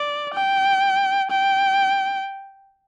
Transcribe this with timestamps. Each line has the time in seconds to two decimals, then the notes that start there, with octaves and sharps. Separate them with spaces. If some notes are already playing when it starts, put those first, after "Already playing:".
Already playing: D5
0.34 G5
1.31 G5